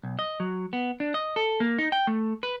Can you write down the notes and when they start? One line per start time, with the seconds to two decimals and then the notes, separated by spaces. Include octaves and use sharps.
0.03 B1
0.19 D#5
0.40 F#3
0.73 B3
1.00 D4
1.14 D#5
1.36 A4
1.60 A#3
1.79 D#4
1.92 G5
2.07 A3
2.43 B4